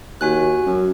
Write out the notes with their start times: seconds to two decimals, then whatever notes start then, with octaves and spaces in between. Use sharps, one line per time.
0.21 D#2 F#4 G#5 F#6
0.66 F#2